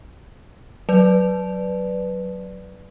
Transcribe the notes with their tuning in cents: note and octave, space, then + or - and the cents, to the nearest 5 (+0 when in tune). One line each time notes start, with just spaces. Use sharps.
F#3 +0 B4 +0 D5 +0